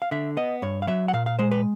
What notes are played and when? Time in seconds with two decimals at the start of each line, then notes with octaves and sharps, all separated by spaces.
0.02 F5
0.11 D3 E5
0.37 B3 D#5
0.62 G2 C#5
0.82 F5
0.87 F#3 E5
1.08 F#5
1.13 A#2 F5
1.26 F5
1.39 G#3 C5
1.51 B4